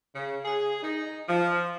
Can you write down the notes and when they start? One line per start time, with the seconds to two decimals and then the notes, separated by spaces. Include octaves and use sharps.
0.15 C#3
0.45 G#4
0.83 D#4
1.28 F3